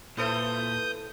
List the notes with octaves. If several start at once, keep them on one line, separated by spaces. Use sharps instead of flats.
A#2 E4 A4 B4 C5 D#6 G6